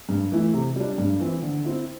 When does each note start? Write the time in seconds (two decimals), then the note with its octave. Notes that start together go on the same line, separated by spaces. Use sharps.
0.09 G2
0.32 E3 A3 E4
0.54 C3
0.76 G3 D4
0.98 G2
1.20 E3 C4 E4
1.42 D3
1.65 C4 E4